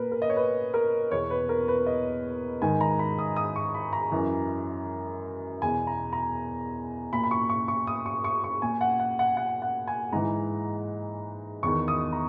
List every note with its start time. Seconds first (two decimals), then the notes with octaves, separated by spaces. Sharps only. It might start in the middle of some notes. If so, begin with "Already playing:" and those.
Already playing: A#2 A#4 B4
0.12 A#4
0.22 D#5
0.29 C#5
0.36 B4
0.74 A#4
1.11 E2 B2 C#5
1.30 B4
1.49 A#4
1.68 B4
1.86 D#5
2.62 G#2 D#3 G#5
2.81 A#5
2.99 B5
3.19 D#6
3.36 D#6
3.56 C#6
3.75 B5
3.93 A#5
4.12 F#2 E3
5.62 E2 B2 G#5
5.87 A#5
6.13 A#5
7.13 A#2 B5
7.23 B5
7.31 C#6
7.50 C#6
7.68 C#6
7.87 D#6
8.06 C#6
8.24 C#6
8.44 C#6
8.62 A#2 G#5
8.81 F#5
9.00 F#5
9.19 F#5
9.37 F#5
9.62 F#5
9.87 G#5
10.12 G#2 E3 A#5
11.63 E2 D#3 C#6
11.88 D#6
12.13 A#5